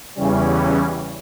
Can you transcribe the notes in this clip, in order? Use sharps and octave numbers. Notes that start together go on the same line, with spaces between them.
E2 C#3 E3 G3 C#4